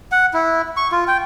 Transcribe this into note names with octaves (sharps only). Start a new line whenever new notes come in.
F#5
E4
C#6
F4
G5